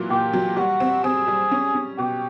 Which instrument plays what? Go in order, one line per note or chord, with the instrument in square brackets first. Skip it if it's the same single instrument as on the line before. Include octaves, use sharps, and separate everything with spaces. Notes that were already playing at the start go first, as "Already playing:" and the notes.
Already playing: [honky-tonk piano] A#2 E3 F#3
[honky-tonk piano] A#2 [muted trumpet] G4
[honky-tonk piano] F#3
[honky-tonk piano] G3 [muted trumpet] F#4
[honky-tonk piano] C4
[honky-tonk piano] C4 [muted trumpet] G#4
[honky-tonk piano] G3
C#4
C#4
[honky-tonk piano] B2 [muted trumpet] G4